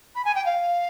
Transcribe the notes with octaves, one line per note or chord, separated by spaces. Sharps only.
B5
G#5
G5
F5